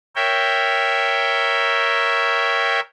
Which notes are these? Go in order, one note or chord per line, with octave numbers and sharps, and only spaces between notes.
A#4 C#5 E5 G5